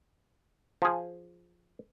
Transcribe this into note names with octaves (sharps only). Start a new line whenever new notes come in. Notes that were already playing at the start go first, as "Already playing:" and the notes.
F3 G#4